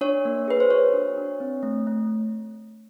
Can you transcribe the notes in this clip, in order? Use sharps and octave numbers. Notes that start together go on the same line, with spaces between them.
D4 C#5
A#3
G#4 B4
C5
F#4 C#5
D4
D4
C4
A3
A3